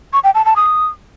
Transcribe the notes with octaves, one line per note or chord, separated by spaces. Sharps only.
C#6
G5
A5
A5
D#6